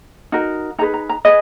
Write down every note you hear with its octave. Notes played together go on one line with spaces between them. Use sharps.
D#4 F#4 A#4
D#4 G#4 B4 A#5
A#5
A#5
G#4 B4 D#5